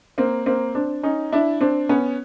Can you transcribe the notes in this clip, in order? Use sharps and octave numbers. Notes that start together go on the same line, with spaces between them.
A#3 C4
A#3 C4
C4 D4
C#4 D#4
D4 E4
C4 D4
B3 C#4